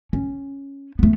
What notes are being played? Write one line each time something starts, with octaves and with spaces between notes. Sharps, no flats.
C#4
A3 B3